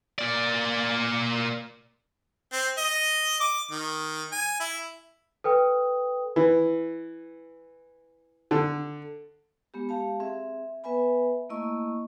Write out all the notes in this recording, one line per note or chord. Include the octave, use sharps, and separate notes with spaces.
A#3 D5
C4
D#5
D6
D#3
G#5
E4
A4 B4 G5 D#6
E3
D3
G#3 B3 G4
G#3 G4 F5 A5
C4 G#4 E5
B3 B4 E5 G#5 B5
A3 A#3 E4 D#5 C#6 E6